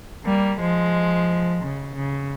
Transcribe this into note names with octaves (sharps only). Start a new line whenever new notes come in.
G3 A#3
F3 G#3
C#3
C#3